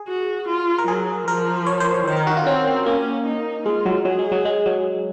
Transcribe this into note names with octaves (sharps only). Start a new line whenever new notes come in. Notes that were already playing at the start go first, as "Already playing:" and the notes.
Already playing: G#4
F#4
F4
A#4
F#3 G#4
F3 A#4
C#5
C5
C#5
D#3 C5
A#4
F#4
F4
C4 C#4
A#3 C#4
D#4
G#3 F4
F#3
F#3 G#4
G#3
F#3
G#3
F#3